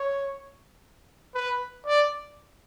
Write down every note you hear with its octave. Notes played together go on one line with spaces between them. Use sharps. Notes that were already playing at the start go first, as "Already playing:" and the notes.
Already playing: C#5
B4
D5